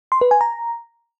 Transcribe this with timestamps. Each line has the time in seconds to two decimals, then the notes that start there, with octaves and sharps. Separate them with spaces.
0.12 C6
0.21 B4
0.31 G#5
0.41 A#5